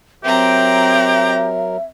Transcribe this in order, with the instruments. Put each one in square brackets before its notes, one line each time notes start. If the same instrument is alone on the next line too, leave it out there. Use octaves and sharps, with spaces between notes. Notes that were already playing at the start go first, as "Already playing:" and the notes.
[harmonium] F#3 A#4 [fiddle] C4 A#5 [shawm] G4 [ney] E5